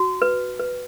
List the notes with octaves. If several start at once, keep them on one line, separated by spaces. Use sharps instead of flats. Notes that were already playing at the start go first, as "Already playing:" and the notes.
Already playing: F#4
B4
B4